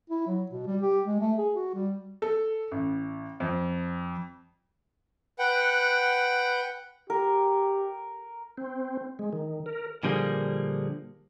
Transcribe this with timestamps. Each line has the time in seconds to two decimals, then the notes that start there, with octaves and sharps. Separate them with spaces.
0.10 E4
0.27 F#3
0.51 B2
0.67 G3
0.82 G4
1.05 G#3
1.20 A3
1.38 G#4
1.55 F#4
1.74 G3
2.22 A4
2.71 A1
3.40 F2
5.39 B4 F#5 G5
7.10 G4 A#4
8.57 C4
9.19 G#3
9.33 D#3
9.66 A#4
10.03 A#2 D3 F3 G3 A#3 G#4